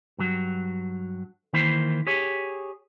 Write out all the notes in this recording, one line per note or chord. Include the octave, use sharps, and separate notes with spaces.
G2 F#3
D#3 E3 A#3 E4 C5
G4 G#4 C#5